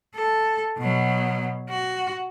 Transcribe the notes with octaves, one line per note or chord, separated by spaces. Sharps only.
A4
B2 F#3
F#4